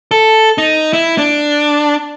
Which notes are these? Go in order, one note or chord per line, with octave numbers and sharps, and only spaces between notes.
A4
D#4
E4
D4